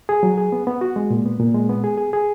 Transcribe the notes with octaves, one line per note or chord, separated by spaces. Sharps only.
G#4
F#3
G#4
B3
B3
F#4
G#3
A#2
B3
A#2
G#3
B3
G#4
G#4
G#4